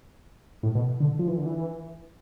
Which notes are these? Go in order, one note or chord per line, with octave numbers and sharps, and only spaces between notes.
A2
B2
D3
F3
E3
D3
E3